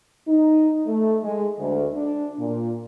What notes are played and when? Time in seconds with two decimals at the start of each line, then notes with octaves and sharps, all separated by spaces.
0.27 D#4
0.87 A3
1.24 G#3
1.59 D2
1.93 D4
2.39 A#2